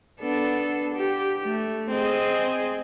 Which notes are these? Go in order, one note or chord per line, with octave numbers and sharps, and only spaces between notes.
B3 D4 A4
G4
A3
C4 G#4 D#5